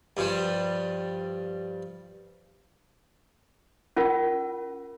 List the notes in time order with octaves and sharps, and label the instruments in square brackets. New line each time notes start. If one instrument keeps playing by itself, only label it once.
[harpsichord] G2 F3 G3
[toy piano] C#4 F4 A#4 F#5